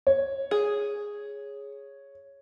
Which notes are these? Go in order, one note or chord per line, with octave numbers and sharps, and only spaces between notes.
C#5
G#4